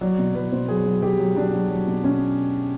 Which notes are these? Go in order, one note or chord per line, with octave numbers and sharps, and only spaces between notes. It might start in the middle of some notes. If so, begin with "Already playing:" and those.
F#3 D5
B2
F#3 B4
B2 C5
F#3 G#4
F#3
F#3 G4
F#3
F#3 D4
F#3
F#3
B2
B2 C#4